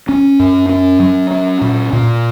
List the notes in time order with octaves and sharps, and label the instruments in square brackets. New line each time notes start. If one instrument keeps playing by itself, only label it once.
[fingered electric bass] C#4
F#2
C#4
F#3
C#4
A#2
A#2